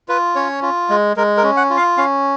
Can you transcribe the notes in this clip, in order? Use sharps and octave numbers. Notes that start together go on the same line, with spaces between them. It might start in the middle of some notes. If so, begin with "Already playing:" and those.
F4 B4
C#4 C#5
F4
G#3
G#3 A#4
A#4
C#4
F#5
F4
F5
C#4 F5